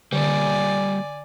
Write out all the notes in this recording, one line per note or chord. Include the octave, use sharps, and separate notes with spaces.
D3 G3 A#3 D5 G#5